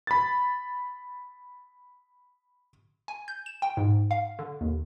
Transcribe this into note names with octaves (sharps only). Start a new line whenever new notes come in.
B5 A6
G#5
G6
E7
G5
G#2
F5
D3
D#2